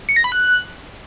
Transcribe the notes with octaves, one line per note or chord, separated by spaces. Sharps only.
C#7
A#6
B5
F#6